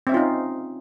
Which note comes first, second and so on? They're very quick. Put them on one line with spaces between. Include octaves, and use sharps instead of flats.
C4 E5 C#4 F4 D#4